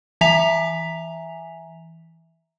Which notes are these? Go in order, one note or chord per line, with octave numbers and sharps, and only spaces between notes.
E3 E5 G#5 A#5 B6 F7